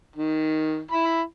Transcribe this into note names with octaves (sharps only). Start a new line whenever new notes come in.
D#3
E4 B5